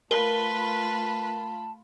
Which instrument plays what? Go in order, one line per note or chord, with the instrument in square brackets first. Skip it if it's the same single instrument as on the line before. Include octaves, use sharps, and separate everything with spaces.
[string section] A3 F4 B5 [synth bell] A#4 G7 [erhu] B4 [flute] A5